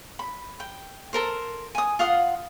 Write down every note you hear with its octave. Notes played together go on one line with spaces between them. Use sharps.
B5
G5
A4 A#4 C5
G#5 D#6
F4 F5 F#5 D#6